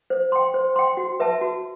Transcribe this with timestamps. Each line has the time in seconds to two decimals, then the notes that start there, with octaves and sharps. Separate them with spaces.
0.10 C5
0.32 G5 C6
0.54 C5
0.76 G5 C6
0.97 F#4
1.20 B4 E5 A5
1.41 F#4